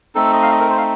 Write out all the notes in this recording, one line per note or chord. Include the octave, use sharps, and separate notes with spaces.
A3 C4 D#4 A4
D#5
F5
D#5
A#4
C5
F5